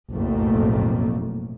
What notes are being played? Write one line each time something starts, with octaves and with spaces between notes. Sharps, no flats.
F#1 B1 F2 A2 A3 A#3